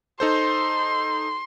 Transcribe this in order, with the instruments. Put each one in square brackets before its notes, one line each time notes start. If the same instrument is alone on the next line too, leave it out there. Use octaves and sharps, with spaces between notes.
[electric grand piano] D#4 A4 C5 [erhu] C6